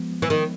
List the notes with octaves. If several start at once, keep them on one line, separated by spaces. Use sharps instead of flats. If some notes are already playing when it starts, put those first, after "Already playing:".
Already playing: F3 G#3 B3
E3
D#3